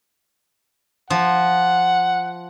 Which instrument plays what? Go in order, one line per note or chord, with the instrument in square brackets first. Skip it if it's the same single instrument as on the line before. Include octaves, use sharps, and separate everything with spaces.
[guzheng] F3 [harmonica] F#5